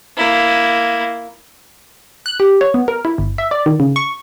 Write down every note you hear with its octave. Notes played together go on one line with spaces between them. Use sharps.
A#3 E4
F#6
G4
C#5
B3
A#4
E4
G1
E5
D5
D#3
C#3
C#6